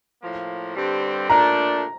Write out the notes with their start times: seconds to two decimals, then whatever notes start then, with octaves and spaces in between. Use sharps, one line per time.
0.22 A2 F3 A#3
0.76 G2 D3 G3 C4
1.29 A#2 A3 D4 A#5